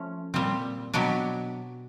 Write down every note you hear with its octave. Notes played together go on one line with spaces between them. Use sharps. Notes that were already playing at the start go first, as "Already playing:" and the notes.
Already playing: F3 A3 C#4
A#2 G3 C4
B2 F#3 B3 D4 G4